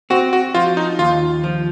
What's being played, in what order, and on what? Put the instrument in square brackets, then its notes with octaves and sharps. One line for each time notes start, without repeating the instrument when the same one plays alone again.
[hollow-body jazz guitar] C4 [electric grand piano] F#4
[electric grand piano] F#4
[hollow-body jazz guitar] F3 [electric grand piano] F4
[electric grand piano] D#4
[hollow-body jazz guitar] D#2 [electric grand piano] F4
[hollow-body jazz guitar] F3